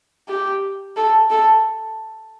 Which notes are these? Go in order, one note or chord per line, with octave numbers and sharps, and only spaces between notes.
G4
A4
A4